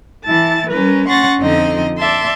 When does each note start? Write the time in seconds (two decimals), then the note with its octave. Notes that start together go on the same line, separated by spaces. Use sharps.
0.25 E3 E4 A5 A6
0.69 G3 C#4 A#4 B4
1.07 C#4 F#5 C6 C#6 A6 A#6
1.39 F2 D3 F3 C4 D#4 D#5
1.98 D5 E5 A5 C6